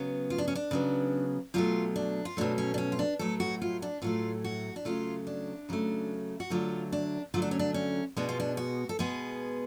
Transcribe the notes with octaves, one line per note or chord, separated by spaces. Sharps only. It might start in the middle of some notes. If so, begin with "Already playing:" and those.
Already playing: C#3 F#3 B3
F4
D4
C#4
D4
C#3 F#3 B3
B2 F#3 A3 F4
D4
F4
B2 F#3 A3 D4
C#4
D4
C#4
F4
D4
A2 F#3 A3 A4
F#4
F4
D4
A2 F#3 A3 F4
F#4
D4
C#3 F#3 A3 F4
D4
C#3 F#3 A3
F#4
D3 F#3 A3 F4
D4
D3 F#3 A3 F4
D4
C#4
D4
C#4
B2 G#3 B3 D4
F4
D4
F#4
A4
B2 G#3 B3 G#4